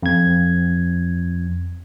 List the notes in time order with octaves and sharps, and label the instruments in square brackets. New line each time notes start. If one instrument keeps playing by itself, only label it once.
[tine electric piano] F2 G#6